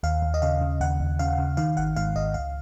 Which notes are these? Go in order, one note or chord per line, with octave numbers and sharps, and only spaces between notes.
D#2 F5
D#2
D#5
C#3 F5
C#3
D#2 F#5
D#2
C#3 F5
C#3
D#3 F5
G#1 F#5
G#2 F5
G#1 D#5
C#2 F5